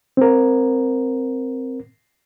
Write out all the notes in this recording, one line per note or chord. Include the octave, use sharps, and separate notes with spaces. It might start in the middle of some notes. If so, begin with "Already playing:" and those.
C4 A#4